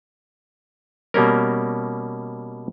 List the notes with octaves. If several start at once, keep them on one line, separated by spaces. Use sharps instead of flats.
B2 G3 A#3 C#4 A#4